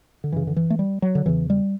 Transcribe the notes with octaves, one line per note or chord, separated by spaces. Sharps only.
D3
F#2 C#3 E3
D3
E3
A3
G3
F#3
D3
E2 C#3 E3
G3